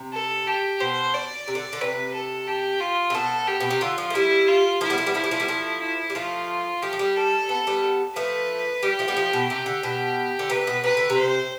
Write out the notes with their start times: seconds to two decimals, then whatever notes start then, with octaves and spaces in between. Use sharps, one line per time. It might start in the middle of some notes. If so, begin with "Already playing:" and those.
Already playing: C3
0.13 A4
0.47 G4
0.80 B2 C5
1.14 D5
1.48 C3
1.55 D3
1.73 D3
1.81 C3 B4
2.14 A4
2.47 G4
2.80 F4
3.10 C3
3.14 B2 A4
3.48 G4
3.60 B2
3.70 C3
3.81 D3 F4
3.98 F3
4.10 A3
4.14 G3 E4
4.48 F4
4.81 F3 A3 E4
4.90 G3 B3
4.98 F3 A3
5.06 G3 B3
5.14 F3 A3 E4
5.24 G3
5.31 F3 A3
5.40 G3 B3
5.48 F3 A3
5.81 E4
6.10 G3
6.15 F3 A3 F4
6.82 F3 A3 G4
6.93 F3
6.99 G3
7.16 A4
7.49 B3 A4
7.67 G3 B3
8.16 F3 A3 B4
8.83 G3 G4
8.99 F3 A3
9.08 G3 B3
9.17 F3 A3
9.33 B2
9.50 C3 G4
9.66 D3
9.83 B2
10.39 D3
10.50 C3 B4
10.67 B2
10.83 C3 B4
10.97 D3
11.10 C3
11.18 C5